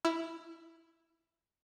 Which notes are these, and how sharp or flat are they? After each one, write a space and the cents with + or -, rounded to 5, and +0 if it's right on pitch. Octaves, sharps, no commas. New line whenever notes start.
E4 +0 E6 +40